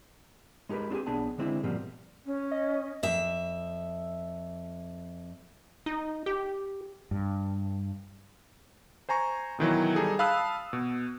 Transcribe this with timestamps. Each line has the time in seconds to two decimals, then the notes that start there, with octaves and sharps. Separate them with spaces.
0.69 G#3 D#4 G4 A#4 B4
0.90 C4 D4 F4 G4 G#4
1.07 B1 B3 D4 G#4 A5
1.38 D3 G#3 C4 E4
1.63 G#2 B2 F3 G3 A#3 C4
2.25 C#4
2.51 D#5
3.03 F2 E5
5.86 D#4
6.26 G4
7.11 G2
9.09 C5 G#5 A#5 C#6
9.59 B2 D#3 E3 F#3
9.95 G3 D#4 G#4 A4
10.19 F5 A5 B5 D#6 E6 F#6
10.73 B2